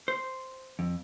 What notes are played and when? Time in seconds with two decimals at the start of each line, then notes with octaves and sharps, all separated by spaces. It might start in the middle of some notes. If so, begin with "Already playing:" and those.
0.08 C5
0.79 F2